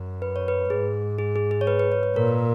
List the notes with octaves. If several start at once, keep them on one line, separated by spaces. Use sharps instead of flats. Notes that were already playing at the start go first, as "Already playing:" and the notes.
Already playing: F#2
B4
C#5
B4
G#2 G#4
G#4
G#4
G#4
C#5
B4
B4
C#5
B4
A#2 A#4